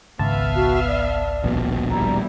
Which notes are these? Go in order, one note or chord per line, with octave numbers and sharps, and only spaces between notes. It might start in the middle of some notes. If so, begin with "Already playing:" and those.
G#1 C#2 B3 E5 F5 A5
F#4
D5
D#1 A#1 B2
G3 E4 A#5